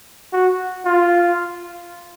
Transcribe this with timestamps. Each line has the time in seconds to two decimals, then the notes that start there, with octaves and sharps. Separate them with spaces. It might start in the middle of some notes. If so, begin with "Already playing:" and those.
0.33 F#4
0.85 F4